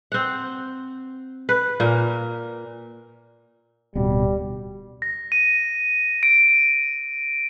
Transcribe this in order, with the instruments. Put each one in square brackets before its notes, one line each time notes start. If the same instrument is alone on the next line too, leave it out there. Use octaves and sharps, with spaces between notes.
[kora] C4 F#5
B4
A#2 A#3
[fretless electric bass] D1 B2 [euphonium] G3
[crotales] A#6
D#7
D7